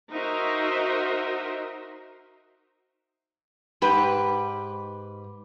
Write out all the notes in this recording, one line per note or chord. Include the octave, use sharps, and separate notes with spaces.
D#4 F#4 A#4 C5 D#5 E5
G#2 G4 B4